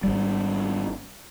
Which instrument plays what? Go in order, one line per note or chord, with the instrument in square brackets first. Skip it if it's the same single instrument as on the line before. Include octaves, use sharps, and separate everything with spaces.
[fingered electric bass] G#1 G3